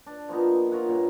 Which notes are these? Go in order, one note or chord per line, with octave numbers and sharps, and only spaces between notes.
D4
F3 A#3 B3 D#4
F4 A#4 C#5 F#5
G2 A#2 C#5